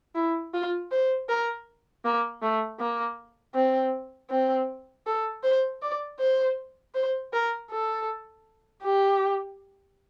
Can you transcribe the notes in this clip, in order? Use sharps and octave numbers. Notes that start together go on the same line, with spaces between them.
E4
F4
C5
A#4
A#3
A3
A#3
C4
C4
A4
C5
D5
C5
C5
A#4
A4
G4